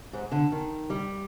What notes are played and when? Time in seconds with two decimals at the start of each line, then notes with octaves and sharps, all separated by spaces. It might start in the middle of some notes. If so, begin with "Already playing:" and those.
0.13 G#2
0.32 D3
0.52 D#3
0.90 G3